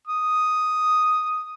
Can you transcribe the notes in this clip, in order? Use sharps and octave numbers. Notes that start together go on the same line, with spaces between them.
D#6